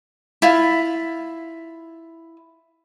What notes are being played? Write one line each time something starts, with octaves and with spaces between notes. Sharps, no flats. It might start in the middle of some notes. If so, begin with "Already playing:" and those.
E4 F4